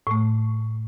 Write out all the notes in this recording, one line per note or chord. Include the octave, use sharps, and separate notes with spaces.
A2 A3